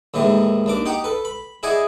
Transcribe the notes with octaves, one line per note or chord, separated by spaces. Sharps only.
D#2 A2 D#3 E3 G#3
D#2 D4 D6
D#4 G4 F#5 G5
A4 B4
B5
E4 G#4 D5 D#5 F#5 G#5